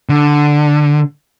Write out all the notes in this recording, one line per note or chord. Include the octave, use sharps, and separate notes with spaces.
D3